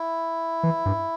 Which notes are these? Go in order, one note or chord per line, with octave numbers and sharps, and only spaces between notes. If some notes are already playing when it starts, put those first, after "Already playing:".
Already playing: E4
E3
G2